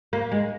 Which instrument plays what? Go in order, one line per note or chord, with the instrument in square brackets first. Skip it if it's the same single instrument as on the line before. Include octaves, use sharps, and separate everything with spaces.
[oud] A#3
G#3